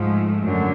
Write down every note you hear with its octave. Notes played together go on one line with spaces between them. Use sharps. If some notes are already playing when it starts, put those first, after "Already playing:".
Already playing: G#2 F3 G#3 A3
F#2 D3 F#3